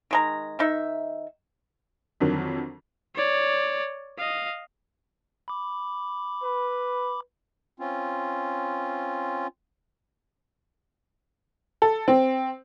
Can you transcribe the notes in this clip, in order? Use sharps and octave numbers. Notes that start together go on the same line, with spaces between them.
D#3 G#3 A#5
D#3 D#4 E5
F2 D3 D#3 F#3
C#5 D5
D#5 F5
B5 D6
B4
C4 C#4 F4
A4
C4